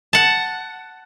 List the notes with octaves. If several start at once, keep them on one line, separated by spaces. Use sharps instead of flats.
F#5 A5